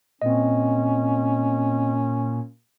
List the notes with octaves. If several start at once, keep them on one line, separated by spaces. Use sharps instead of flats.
A#2 C4 C#4 D#5